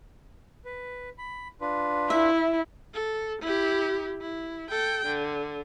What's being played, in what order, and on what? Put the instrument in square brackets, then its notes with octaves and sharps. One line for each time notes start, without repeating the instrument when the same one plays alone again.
[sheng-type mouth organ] B4
B5
D4 F4 B4
[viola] E4 [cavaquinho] E5
[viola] A4
E4 G4
E4
A4 G5
D3